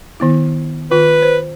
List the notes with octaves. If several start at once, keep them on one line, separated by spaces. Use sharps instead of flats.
D#3 B3 E4
D#3 F4 B4
C5